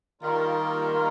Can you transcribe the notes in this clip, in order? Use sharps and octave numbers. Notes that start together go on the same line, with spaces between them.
D#3 G3 A#3 F4 A#4
G3 A#3 F4 A#4